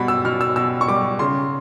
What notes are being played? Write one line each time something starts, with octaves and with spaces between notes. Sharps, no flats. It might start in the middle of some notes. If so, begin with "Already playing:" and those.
Already playing: B2 G3 B3 B5
E6
B2 F6
E6
B2 E6
C#6
G3 D6
C#3 C6